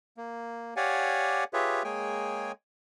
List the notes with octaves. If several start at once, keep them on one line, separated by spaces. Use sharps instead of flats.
A#3
G4 C#5 D5 F5 F#5 G#5
F4 G4 G#4 B4 C#5 E5
G#3 A#3 G#4 C#5 G5 G#5